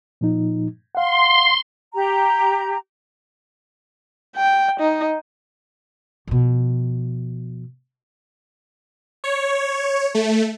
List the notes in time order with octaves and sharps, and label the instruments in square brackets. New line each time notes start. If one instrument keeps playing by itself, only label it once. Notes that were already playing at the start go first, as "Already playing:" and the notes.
[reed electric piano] A#2 F3 D#4
[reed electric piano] F5 F#5 [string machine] C6
[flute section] G4 A#5
[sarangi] G5
D#4
[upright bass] B2 F3
[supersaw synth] C#5
A3